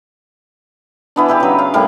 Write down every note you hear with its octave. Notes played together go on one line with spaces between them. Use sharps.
E3 B3 D4
G4 G#4 B4 E5
C#3 F#3
F5
A2 G3 A#3 A#4